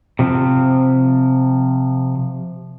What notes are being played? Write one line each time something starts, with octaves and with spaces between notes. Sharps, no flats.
C3 F3